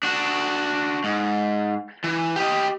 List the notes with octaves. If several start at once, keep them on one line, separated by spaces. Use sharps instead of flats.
D4 F#4
G#2
E3
G4 D#5